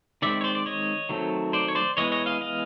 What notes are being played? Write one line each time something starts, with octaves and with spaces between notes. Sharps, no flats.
D#3 G#3 C4 D5 E5
C#5
C5 D5
D5
C#5 D#5
D#3 F#3 A3 C4
C5 D5
C#5
C5 D5
E3 G#3 B3 C#5 D#5
C#5 D#5
D#5 F5
D#5 F5